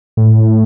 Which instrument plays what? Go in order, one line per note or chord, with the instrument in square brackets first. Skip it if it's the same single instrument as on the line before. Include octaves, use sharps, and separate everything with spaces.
[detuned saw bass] A2